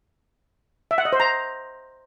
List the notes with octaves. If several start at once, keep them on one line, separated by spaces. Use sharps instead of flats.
E5
F#5
D#5
C5
A#5